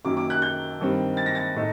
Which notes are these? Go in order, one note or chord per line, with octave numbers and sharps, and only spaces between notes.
F#2 D#3 F#3 A#3 D6
D6
F#6
G6
G2 D#3 G3 C4
A6
A#6
A6
A2 A3 D#4